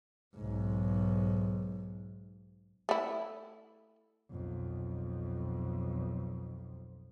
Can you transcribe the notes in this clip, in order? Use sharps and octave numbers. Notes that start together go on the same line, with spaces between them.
B1 G#2
A3 E4
B1 F2